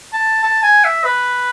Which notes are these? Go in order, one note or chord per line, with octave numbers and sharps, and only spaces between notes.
A5
A5
G#5
E5
B4